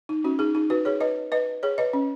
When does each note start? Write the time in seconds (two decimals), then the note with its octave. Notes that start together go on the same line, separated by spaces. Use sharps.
0.09 D#4
0.24 C#4 F#4
0.39 D#4 G#4
0.55 D#4 G#4
0.70 F#4 B4
0.85 G#4 C#5
1.01 B4 D#5
1.32 B4 D#5
1.63 G#4 C#5
1.78 B4 D#5
1.93 C#4